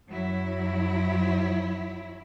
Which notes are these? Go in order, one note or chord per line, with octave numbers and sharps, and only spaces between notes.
F#2 F#3 E4